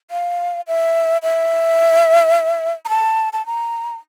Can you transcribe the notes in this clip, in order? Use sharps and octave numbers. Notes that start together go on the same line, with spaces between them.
F5
E5
E5
A#5
A5
A5
A#5